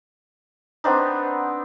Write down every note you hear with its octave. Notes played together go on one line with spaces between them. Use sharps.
B3 C4 D4 D#4